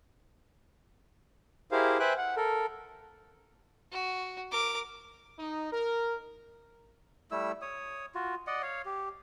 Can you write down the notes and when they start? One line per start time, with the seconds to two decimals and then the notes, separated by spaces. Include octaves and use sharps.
1.72 E4 G4 G#4 A#4 C5 F5
2.00 B4 C5 E5 G5 G#5 F#6
2.17 F#5
2.37 A4 A#4
3.92 F#4
4.51 A#4 D6
5.39 D#4
5.72 A#4
7.31 G3 A3 E4 E6
7.62 C#5 D#6
8.15 F4 F#4
8.47 D5 D#5 F#5
8.62 C#5 F5
8.85 G4